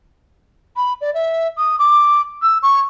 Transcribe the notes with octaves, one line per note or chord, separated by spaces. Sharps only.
B5
D5
E5
D#6
D6
E6
C#6